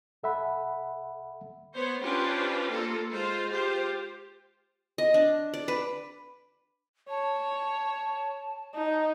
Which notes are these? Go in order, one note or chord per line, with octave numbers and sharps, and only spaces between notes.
C2 A4 E5 F#5 B5
B3 C5 C#5
C#4 D4 F4 G4 B4 C5
A#3 F4 A4
G#3 F4 C5
F4 G4 C5
D#5
D4
D5
B4
C#5 A5
D#4